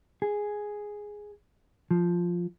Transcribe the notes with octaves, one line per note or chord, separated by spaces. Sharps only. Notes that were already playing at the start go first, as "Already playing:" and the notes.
G#4
F3